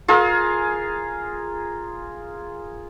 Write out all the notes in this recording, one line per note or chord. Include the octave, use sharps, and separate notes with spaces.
F4 G#4 A#4